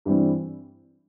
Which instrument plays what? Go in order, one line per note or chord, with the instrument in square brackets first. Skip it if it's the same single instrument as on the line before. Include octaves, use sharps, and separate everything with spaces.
[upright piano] G2 E3 G3 C4